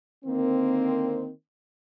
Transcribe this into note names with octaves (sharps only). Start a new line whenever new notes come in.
D3 D#3 A#3 C4